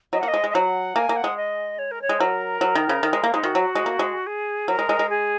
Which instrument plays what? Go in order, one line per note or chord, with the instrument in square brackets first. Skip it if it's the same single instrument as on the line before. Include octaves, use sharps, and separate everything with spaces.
[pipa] F#3 [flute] D#5
[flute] F#5
[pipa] A#3
[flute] D#5
[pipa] G#3
G#3
[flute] D#5
[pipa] F#3 [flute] F#5
[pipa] A#3 [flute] G#5
[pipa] A#3
[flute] F#5
[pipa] G#3
[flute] D#5
C#5
A#4
C#5
[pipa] G#3
[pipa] F#3 [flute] A#4
[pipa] F#3
D#3
C#3
D#3
G#3
A#3
[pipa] G#3 [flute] D#4
[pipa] D#3 [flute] F#4
[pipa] F#3
G#3
A#3
G#3
[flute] G#4
[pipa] F#3 [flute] A#4
[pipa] G#3
G#3
G#3
[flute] G#4